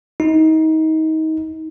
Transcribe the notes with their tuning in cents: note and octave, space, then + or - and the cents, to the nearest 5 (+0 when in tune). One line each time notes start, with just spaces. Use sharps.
D#4 +25